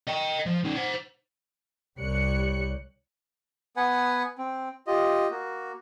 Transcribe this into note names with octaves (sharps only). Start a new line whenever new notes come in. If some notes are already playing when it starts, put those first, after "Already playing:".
D#5 G5
F3
C#3 D#4
C5 F#5
C2 G3 C#5 F#6 C#7
B3 B4 F#5 G#5
C4
F4 G4 D#5
A#3 F#4